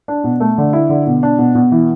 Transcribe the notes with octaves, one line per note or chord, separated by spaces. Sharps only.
D4
B2
A3
D3
E4
D3
B2
D4
B2
B2
E3